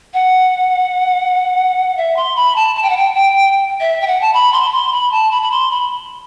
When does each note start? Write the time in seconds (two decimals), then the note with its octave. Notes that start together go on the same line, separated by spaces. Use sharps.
0.14 F#5
1.97 E5
2.17 C6
2.36 B5
2.56 A5
2.76 A5
2.83 G5
2.90 F#5
2.97 G5
3.15 G5
3.80 E5
4.01 G5
4.07 F#5
4.21 A5
4.34 B5
4.52 C6
4.65 B5
4.72 C6
4.92 B5
5.12 A5
5.31 B5
5.43 B5
5.51 C6
5.71 B5